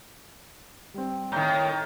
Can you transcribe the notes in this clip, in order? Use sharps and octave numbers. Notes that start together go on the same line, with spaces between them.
G3 C4
A2 D#3 A#5 G6